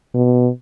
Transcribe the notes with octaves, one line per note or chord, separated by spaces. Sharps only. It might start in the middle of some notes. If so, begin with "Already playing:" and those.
B2